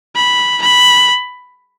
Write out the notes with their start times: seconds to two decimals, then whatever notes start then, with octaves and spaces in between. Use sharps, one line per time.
0.16 B5
0.62 B5